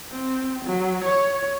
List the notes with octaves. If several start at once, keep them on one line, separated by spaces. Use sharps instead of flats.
C4
F#3
C#5